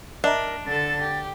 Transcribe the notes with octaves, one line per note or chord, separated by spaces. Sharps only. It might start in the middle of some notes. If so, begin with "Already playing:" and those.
D4 A#4 D#5 E5 A#5
D3 A4 A6
G4